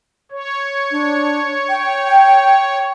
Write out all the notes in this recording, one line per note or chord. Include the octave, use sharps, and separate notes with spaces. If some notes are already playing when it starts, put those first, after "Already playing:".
C#5
D4
G5